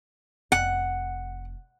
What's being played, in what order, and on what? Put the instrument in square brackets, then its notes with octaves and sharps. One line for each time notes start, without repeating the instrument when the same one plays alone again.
[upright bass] F1 [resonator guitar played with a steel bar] F#5